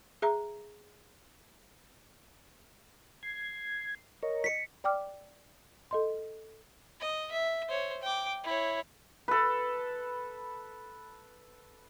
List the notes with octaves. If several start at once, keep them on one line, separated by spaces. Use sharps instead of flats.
G#4 E5 A#5
G#6 C7
A#4 C#5 D#5
B6 C#7
D5 G5 D6 F6
A4 D#5 C6
D#5
E5
C5 C#5
G5 D6
E4 C#5
A4 B4